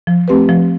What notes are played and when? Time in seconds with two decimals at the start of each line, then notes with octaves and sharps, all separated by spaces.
0.07 F3
0.28 A3 C4 G4 B4
0.49 F3